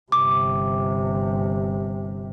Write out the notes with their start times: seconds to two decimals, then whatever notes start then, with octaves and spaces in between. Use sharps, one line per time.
0.12 G1 C3 D6